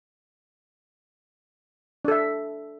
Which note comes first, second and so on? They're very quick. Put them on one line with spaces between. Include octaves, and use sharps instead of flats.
D4 A4 E5